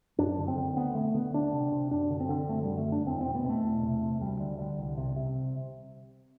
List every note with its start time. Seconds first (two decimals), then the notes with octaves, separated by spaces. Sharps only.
0.19 F#2 D4
0.38 D3
0.48 C4
0.57 D3
0.76 D2 B3
0.95 D3 A3
1.15 D3 B3
1.34 D2 D4
1.53 C3
1.72 C3
1.91 F#2 D4
2.10 D3
2.20 C4
2.29 D3
2.49 F#2 A3
2.63 D3 G3
2.77 A3
2.87 D3
2.92 D4
3.06 E2 C4
3.21 B2 C4
3.35 B3
3.44 B2 A3
3.63 E2
3.82 C3
4.02 C3
4.21 D2 G3
4.40 D3
4.59 D3
4.78 C2
4.97 C3
5.16 C3